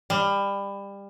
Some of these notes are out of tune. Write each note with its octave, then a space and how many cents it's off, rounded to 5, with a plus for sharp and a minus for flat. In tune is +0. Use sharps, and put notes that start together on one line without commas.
G3 +25